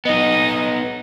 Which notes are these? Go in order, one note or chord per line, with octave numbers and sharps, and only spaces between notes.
B3 D#4 D#5